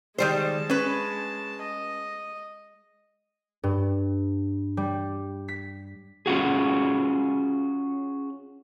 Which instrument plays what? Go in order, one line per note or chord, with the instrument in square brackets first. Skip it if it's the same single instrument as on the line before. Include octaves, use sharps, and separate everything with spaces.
[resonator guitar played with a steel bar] D#3 G3 C5 [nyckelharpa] G#3 A5
[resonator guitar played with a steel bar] C#4 B4
[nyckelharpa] D#5
[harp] G2
G3
B6
[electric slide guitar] C#4 F4 F#4 G#4